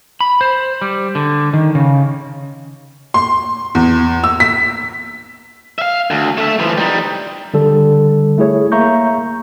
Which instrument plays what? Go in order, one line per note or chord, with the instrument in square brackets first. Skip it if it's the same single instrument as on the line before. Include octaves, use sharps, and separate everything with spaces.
[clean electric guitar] B5
C5
G3
D3
D#3
C#3
[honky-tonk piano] C6
E2
E6
B6
[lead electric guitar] E5 F5
D2
A3 E5
E3 F3
G3 D#4
[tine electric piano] D3 G3 A4
A3 E4 G#4 C#5
A#3 E5 A#5 C#6 G6